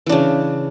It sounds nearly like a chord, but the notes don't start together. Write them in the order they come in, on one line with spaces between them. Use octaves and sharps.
E3 D4 C#3